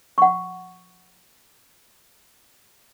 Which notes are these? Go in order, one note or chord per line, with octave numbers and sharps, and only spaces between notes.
F#5 C#6